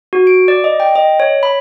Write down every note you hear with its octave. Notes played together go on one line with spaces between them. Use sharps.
F#4
D7
D5
D#5
G5
D#5
C#5
B5